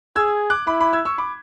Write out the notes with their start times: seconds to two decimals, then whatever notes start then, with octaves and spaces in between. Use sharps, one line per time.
0.16 G#4 E6 G#6
0.50 D6 F#6
0.67 E4 B5 D6
0.80 B5 D6
0.93 E6 G#6
1.05 C#6 E6
1.18 B5 D6